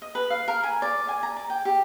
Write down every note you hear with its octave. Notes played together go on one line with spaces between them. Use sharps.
D#5
B4
F5
A#4
G#5
D5
G#5
A#5
D5
G5
G4